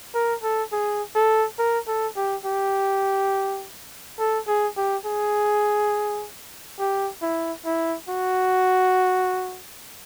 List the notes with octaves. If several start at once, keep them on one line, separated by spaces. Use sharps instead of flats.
A#4
A4
G#4
A4
A#4
A4
G4
G4
A4
G#4
G4
G#4
G4
E4
E4
F#4